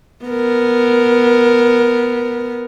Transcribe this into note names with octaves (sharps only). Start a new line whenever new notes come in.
B3 A#4